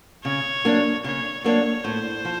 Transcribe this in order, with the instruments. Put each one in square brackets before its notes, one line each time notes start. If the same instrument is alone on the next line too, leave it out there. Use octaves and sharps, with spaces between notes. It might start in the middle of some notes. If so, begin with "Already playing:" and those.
[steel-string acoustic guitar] C#3 [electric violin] C#5
[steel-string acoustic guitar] F#3 A#3 D4
[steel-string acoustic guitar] C#3 [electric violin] C#5
[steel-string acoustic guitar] F#3 A#3 D4 [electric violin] C#5
[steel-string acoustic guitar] A2 [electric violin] C5
[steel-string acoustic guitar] F3